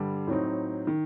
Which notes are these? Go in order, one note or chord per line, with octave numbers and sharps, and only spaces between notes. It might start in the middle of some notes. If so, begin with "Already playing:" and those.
Already playing: G2 D3 G3
A2 F#3 C4 D#4
D#3